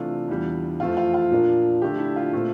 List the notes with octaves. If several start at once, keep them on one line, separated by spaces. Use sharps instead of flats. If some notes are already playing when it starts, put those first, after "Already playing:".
Already playing: C3 E3 A3 D4 F4
E2 E3 G3 D4
F2 E3 A3 C4 F4
F4
F4
A#2 F3 A#3 D4
D3 F3 A3 D4 G4
E4
F4
A#2 A3 C4